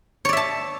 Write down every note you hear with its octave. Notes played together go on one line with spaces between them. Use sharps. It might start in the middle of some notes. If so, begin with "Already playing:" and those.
C#5 D5 E5 A5